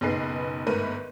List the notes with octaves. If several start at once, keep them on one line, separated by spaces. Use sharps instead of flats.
F#1 B1 D#4 G#4 B4 C7
G1 G#2 A3 A#4 B4 D#7